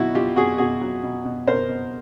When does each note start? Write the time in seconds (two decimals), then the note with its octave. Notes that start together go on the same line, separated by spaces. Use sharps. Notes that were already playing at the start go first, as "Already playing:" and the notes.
Already playing: B2 F#3 D#4 E4 F#4
0.14 B2 F4 G4
0.36 B2 F#4 G#4
0.58 B2 F#4 G#4
0.81 F#3
1.03 B2
1.25 B2
1.47 B2 A#4 C5
1.69 B2